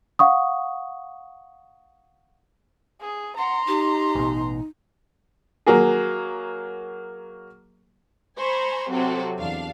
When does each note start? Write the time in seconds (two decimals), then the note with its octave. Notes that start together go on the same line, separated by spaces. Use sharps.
0.19 F5 F#5 C#6 D#6
3.01 G#4
3.37 F#5 A#5 C6
3.67 D#4 G4
4.15 A1 B2
5.66 F#3 A#3 F#4 G#4
8.38 C5 G#5 A#5 B5 C#6
8.90 C3 F#3 C4 F#4 A4
9.38 E2 D4 F5